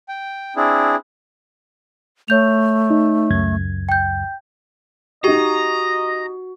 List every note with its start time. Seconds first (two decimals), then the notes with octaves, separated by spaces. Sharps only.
0.09 G5
0.56 C4 D4 E4 G#4
2.28 A3 C#5 G6 F7
2.90 D#4
3.30 C#2 F#2 G#6
3.89 G5 G6
5.24 D#4 F#4 G4 D#5 A#5